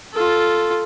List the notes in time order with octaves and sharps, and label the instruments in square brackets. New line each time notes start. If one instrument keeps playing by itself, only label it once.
[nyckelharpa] F4 A4